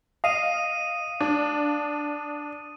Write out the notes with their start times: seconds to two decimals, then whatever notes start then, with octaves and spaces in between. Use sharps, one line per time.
0.24 D#5 F5 D#6 D#7
1.21 D4